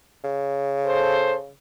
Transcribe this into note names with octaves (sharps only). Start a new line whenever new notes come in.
C#3
A4 C5